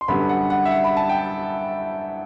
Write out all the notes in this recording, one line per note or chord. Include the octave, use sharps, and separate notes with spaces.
C6
F#2 D3 G3 B3 B5
F#5
F#5
E5
F#5
B5
A5
G5